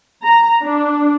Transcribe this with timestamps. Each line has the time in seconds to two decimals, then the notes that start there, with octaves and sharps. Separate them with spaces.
0.24 A#5
0.64 D4